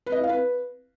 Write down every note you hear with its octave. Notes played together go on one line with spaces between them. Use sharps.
B4
D#5
E4
F5
B4